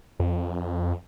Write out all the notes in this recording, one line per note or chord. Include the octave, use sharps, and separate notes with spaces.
F2